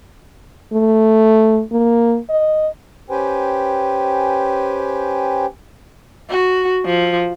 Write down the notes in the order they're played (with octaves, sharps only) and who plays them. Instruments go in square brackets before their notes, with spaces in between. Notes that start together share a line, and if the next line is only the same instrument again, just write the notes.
[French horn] A3
A#3
D#5
[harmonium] C#4 G4 B4 C5 G5 G#5
[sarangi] F#4
F3